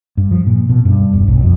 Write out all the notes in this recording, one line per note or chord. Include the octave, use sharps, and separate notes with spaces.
G2
F3
A#2
B2
G2
E1
B1
F2